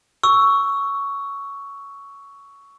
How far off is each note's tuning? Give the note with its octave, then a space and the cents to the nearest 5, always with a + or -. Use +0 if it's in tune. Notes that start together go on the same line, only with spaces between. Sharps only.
C#6 +10 E6 +0